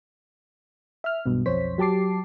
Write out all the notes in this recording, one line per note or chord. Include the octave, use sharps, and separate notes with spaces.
E5 F6
B1 G2 B2
B1 F2 C5 C#5 B6
F#3 G4 A5 D6 C7